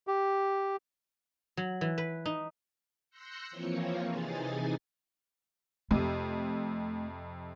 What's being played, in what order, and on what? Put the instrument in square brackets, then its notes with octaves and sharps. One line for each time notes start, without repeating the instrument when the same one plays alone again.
[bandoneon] G4
[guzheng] F#3
E3
B4
D#4
[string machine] C6 E6 F#6 G6 A#6 C#7
E3 F3 A#3 C4 F4 C#5
C3 E3 D#4 G#4 G#5 A6
[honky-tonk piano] F2 C3 [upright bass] A3